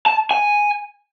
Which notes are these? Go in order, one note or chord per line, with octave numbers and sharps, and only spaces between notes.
A5
G#5